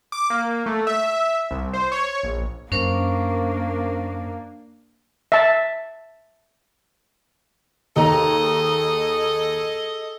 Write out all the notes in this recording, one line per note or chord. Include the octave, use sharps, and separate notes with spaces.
D6
A#3
A3
E5
C2
C5
C#5
A#1
F#2 A#3 C#4 D4 A#4 C5
E5 A5
D#2 G#4 A4 D#5 A#5